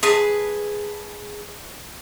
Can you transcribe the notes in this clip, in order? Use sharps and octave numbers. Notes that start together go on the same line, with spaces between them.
G#4 B4 A5